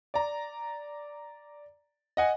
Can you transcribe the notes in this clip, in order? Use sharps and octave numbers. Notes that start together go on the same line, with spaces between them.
D5 A#5
D#5 F#5 G#5